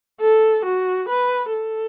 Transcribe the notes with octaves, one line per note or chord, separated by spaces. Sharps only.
A4
F#4
B4
A4